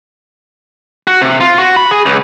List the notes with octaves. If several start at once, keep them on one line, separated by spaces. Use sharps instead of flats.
F#4
C3
F4
F#4
B5
G#4
C#2